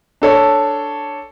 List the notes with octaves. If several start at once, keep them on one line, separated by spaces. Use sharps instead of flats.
D4 A4 C#5